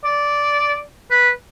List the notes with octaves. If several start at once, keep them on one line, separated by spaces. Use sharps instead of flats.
D5
B4